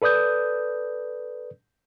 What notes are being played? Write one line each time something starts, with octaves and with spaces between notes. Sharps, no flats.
A4 B4 D5 D#6 G6